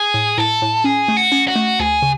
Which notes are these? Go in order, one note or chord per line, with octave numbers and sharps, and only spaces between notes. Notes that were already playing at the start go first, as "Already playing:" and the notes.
Already playing: G#4
A2
A2 A4
A2
C#4 G#4
A3
F#4
C#4
F#4
A3
D2 G#4
C#3